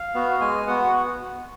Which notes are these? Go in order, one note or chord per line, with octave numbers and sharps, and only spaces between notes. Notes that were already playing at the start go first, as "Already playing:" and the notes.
Already playing: F5
B3 F#4
G#3 G#5
B3 F#4 F#5